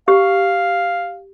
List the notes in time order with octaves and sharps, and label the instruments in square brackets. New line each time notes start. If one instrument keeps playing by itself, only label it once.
[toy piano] G4 [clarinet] F5